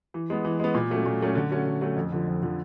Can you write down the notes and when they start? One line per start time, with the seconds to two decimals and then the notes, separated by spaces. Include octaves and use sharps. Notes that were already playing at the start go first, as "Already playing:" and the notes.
0.14 E3
0.30 G#3 B3
0.45 E3
0.60 G#3 B3
0.74 A#2
0.90 F#3 A3 C#4
1.06 A#2
1.21 F#3 A3 C#4
1.35 D3
1.50 F#3 A3 C#4
1.66 D3
1.81 F#3 A3 C#4
1.96 F2
2.12 D3 F3
2.27 F2
2.42 D3 F3